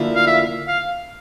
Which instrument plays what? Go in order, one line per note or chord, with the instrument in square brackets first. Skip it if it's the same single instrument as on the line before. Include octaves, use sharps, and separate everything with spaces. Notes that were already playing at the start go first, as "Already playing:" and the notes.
Already playing: [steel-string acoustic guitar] D2 D3 F3 A#3 E4
[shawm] F5
E5
F5